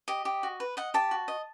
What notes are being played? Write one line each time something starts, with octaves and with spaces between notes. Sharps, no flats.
G4 D#5
G4
F#4
B4
D#5 F#5
G4 A5
F#4
D#5